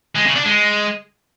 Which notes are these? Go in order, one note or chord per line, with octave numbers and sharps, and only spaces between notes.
G#3
C#3
D4
G#3